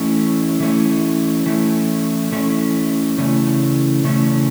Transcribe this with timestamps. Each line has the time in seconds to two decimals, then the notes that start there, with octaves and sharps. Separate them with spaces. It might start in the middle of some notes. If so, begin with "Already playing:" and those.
Already playing: E3 A3 C#4 E4
0.60 E3 A3 C#4 E4
1.46 E3 A3 C#4 E4
2.32 E3 A3 C#4 E4
3.18 C#3 E3 A3 C#4 E4
4.04 C#3 E3 A3 C#4 E4